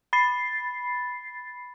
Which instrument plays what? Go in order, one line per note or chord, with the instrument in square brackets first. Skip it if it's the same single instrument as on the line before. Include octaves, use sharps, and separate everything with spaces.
[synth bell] B5 A6 C7